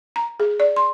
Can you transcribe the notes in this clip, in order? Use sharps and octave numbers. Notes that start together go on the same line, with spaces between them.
A#5
G#4
D5
C6